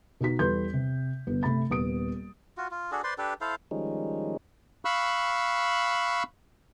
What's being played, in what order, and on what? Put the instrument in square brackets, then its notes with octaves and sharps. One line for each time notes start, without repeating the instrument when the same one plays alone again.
[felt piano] B2 D#4 F#4 B6
E2 G3 A4 B4 C6 G6
C3
G1 B3
C3 A3 B5 A6
D#1 B3 D#6 D7
[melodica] F4 F#4
F4
D4 F#4 G#4 A4
B4 C5 D5 C6
D4 G4 A4 B4
E4 A4 C5 F5
[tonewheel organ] D#3 F3 G3 G#3 C#4 D#4
[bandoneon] F5 B5 C#6 E6 F#6